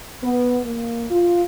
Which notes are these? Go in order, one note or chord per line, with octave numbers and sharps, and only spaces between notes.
B3
A#3
F4